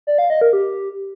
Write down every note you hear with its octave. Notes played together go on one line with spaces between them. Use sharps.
D5
F5
D#5
A#4
G4